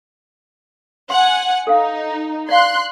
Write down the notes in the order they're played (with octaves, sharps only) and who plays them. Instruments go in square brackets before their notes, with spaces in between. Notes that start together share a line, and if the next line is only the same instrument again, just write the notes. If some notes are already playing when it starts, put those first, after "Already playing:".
[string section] F#5 G#5 [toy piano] C6
[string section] D#4 [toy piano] A4 F5
[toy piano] D5 F5 [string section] C6 F#6